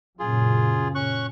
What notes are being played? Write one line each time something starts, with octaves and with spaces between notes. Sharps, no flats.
F#2 A#2 C#3 F4 G#4
C#4 C#6 F#6